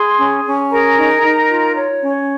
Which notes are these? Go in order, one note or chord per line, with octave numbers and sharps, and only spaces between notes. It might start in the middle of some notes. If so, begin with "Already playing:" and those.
Already playing: G#4 C6
C#4
C#4
G#4 A#4 A#5
D#4
D#4
F4
C#5
C#4